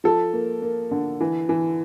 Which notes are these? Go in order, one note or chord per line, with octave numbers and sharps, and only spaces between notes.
F3 A4
A#3
A#3
D3
E3
E3